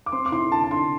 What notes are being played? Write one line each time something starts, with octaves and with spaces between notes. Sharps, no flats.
D6
C4 C6
D6
E4 C6
D3 A5
A5
D3 C6